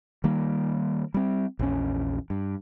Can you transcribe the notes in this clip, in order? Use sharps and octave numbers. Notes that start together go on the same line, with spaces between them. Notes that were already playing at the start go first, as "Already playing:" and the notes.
D#3 G3 A#3
G3 C4
A#1 E2 C#4
G2